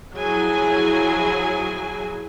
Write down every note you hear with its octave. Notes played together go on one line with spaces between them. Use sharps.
F3 F#3 E4 G#4 G#5